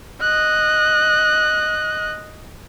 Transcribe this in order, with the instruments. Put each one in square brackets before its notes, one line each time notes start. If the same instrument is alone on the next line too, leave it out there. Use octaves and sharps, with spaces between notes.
[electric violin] D#5 F#6